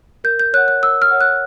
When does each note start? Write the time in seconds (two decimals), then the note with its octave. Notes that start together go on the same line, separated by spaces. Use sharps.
0.24 A#4 G6
0.39 G6
0.53 C#5 F#5 F#6
0.68 F#6
0.83 A#4 E6
1.02 F6
1.11 C#5 F#5
1.21 F#6